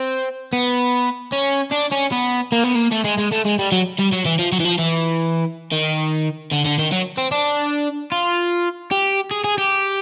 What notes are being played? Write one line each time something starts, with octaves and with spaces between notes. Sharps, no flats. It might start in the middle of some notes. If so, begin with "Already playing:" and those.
Already playing: C4
B3
C#4
D4
C#4
B3
A#3
B3
A#3
A3
G#3
G#3
A3
G#3
G3
F#3
G3
F#3
E3
F3
F#3
E3
F3
E3
D#3
D3
D3
D#3
F#3
C4
D4
F4
G4
G#4
G#4
G4